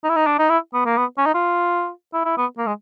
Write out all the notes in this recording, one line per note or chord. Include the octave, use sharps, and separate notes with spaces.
D#4
E4
D#4
D4
D#4
E4
B3
A#3
B3
C#4
D#4
F4
E4
E4
B3
A#3
G#3